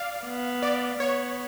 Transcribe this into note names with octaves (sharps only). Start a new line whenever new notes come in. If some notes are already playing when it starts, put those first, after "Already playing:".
Already playing: D5 F5
B3
D5
B3 C#5